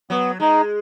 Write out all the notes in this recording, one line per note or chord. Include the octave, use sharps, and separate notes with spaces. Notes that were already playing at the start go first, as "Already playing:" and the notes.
F#3 B3
G#3 D#4